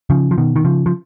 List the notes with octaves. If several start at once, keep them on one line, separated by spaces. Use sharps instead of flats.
C#3 F3
F3
B2 D#3
D#3
C#3 F3
F3